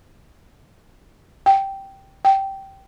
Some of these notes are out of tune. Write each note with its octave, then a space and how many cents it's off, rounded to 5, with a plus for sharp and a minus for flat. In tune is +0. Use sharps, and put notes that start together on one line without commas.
G5 -5
G5 -10